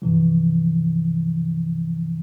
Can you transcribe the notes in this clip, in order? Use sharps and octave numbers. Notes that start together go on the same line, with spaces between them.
G2 C3 E3 F3